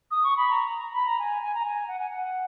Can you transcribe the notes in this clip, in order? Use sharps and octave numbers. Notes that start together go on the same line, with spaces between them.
D#6
C#6
B5
A#5
B5
A#5
G#5
G#5
A#5
G#5
F#5
G#5
F#5